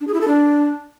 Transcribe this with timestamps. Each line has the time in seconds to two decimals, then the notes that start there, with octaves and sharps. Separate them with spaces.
0.01 D4
0.07 G#4
0.14 E4
0.21 A4
0.28 D4